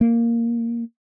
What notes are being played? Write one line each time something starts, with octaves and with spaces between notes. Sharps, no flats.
A#3